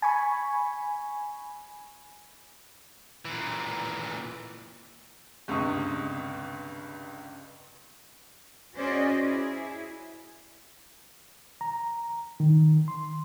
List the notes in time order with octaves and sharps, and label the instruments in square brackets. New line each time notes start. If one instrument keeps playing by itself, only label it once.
[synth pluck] G#5 B5 C#6
[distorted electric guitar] A#2 E3
[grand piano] G1 C#2 G2 C3 C#6 D#6
[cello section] C#4 F#4 G#4 C5 D5 D#5
E4 G#4
[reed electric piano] A#5
D#3
C6